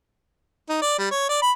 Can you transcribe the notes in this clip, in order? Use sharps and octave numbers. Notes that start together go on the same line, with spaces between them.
D#4
D5
G3
C#5
D5
B5